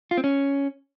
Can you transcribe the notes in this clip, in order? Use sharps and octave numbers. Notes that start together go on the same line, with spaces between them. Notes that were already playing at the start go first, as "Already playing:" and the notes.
F4
C4
C#4